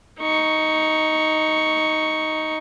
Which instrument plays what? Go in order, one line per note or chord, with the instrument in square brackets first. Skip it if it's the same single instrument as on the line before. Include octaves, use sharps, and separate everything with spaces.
[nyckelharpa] D#4 C#6